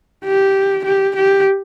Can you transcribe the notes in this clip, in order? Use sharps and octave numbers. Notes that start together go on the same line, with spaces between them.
G4
G4
G4